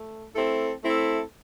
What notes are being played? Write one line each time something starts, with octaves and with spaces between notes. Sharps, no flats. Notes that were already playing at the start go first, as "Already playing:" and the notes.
Already playing: A3
A3 C4 E4 A4
A3 C4 E4 A4